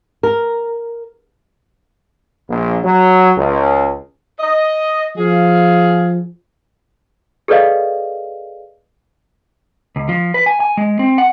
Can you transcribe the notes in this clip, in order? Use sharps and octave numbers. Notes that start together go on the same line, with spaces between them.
A#4
A#1
F#3
C#2
D#5
F3 G#4 F5
G#4 A4 B4 D5 D#5 F5
C#2
F3
B4
G#5
G#5
G#3
C4
F#5